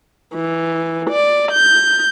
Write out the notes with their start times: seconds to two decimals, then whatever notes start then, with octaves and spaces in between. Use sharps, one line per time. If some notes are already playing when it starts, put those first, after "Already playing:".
0.34 E3
1.11 D5
1.52 G6